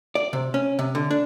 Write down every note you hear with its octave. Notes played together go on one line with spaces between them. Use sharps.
D5
C3
C#4
C3
D3
D4